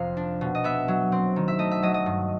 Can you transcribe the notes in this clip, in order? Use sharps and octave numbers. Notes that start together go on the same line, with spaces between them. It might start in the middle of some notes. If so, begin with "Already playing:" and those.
Already playing: F2 C3 F3 F5
D4
B2
D#5
B3 E5
F#3
C4
D#3
E5
A3 D#5
E5
F#3 D#5
D#5
G2